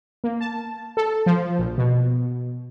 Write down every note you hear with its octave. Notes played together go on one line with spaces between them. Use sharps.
A#3
A5
A4
F3
A#1
B2